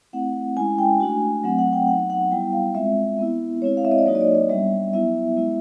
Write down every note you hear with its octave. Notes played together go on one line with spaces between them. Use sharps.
A3 C4 E4 F#5
G#3 C#4 E4 G#5
G5
A3 D4 F#4 G#5
F#3 A3 C4 F#5
F#5
G5
F#3 B3 D#4 F#5
F#5
G3 B3 E4 G5
F5
G#3 C4 F4 E5
B3 E4
G#3 C4 E4 C#5
F5
E5
D#5
D5
F#3 A#3 D#4 F#4 C#5
D#5
D5
D#5
G3 B3 D4 E5
F#3 B3 E4 E5
G#3 B3 E4